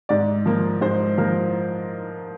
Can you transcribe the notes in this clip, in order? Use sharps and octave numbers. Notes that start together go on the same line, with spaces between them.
G#2 D5
F3 A#3
G#2 C5
F3 A#3 A#4